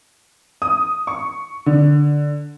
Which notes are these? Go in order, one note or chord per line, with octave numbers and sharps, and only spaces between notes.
D#6
C#6
D3